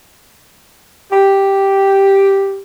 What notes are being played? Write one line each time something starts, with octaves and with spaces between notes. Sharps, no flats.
G4